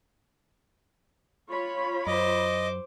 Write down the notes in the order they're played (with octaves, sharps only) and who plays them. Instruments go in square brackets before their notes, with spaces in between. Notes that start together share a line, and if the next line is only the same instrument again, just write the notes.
[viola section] F4 C#5 B5
[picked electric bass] F#2 [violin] C5 D6 [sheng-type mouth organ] D#5